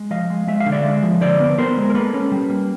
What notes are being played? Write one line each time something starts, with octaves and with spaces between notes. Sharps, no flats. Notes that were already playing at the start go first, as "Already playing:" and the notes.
Already playing: G#3
F3 D#5 F5
G#3
G#3 E5
F5
D3
D5 E5
G#3
F3
D3 C5 D5
B3
B3 A#4 C5
G#3
A#4
A#3 A4 B4
C#4
G3
A#3